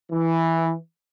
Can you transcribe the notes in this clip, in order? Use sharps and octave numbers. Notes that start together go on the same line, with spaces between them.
E3